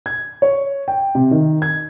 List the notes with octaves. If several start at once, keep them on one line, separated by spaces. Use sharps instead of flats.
G#6
C#5
G5
C3
D#3
G#6